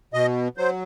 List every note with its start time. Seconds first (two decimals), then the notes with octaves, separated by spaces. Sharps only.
0.14 B2 D#5
0.57 F#3 C5